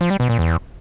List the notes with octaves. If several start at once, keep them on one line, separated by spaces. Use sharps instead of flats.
F3
G3
B2
A#2
E2